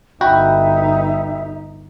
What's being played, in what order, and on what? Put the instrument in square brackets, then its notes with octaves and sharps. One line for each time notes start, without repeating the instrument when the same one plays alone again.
[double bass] G1 D#4 [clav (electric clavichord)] F#4 [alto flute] E5 [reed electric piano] G5 B5